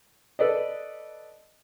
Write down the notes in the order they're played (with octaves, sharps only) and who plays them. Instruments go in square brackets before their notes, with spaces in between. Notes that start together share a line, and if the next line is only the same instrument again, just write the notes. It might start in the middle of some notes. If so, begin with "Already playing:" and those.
[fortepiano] A4 B4 D5 D#5